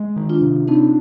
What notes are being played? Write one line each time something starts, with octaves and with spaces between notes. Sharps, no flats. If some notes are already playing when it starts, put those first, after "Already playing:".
Already playing: G#3
D#3
D4 F4
C3
C4 D4 D#4